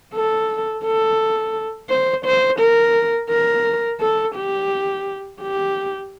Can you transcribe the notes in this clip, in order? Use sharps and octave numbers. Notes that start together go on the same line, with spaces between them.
A4
A4
C5
C5
A#4
A#4
A4
G4
G4